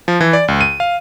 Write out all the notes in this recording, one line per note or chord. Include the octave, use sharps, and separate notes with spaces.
F3
E3
D5
C#2
D#7
F5